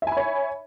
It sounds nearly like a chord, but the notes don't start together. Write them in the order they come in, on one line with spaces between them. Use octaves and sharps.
E5 G#5 B5 C#5